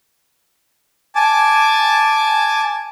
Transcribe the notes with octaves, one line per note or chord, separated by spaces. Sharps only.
G#5 A5 D6